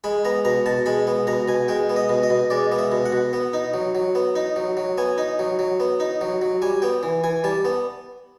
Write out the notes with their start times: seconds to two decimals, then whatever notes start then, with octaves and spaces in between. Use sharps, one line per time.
0.04 G#3 B5
0.25 B3 A#5
0.45 B2 A#5
0.66 B2 A5
0.86 G#3 B5
1.07 B3
1.27 B2 A#5
1.48 B2 G#5
1.68 G#3 G5
1.89 B3
1.96 D#5
2.09 B2
2.23 D#5
2.30 B2
2.50 G#3 D5
2.72 B3
2.78 E5
2.92 B2
3.06 F#5
3.12 B2
3.33 B3
3.53 D#4
3.74 F#3
3.95 F#3
4.15 B3
4.36 D#4
4.56 F#3
4.77 F#3
4.98 B3 G#5
5.18 D#4
5.39 F#3
5.59 F#3
5.80 B3
6.00 D#4
6.21 F#3
6.42 F#3
6.62 G3 G#5
6.82 B3 G5
7.03 E3
7.24 E3 G#5
7.44 G3 A5
7.65 B3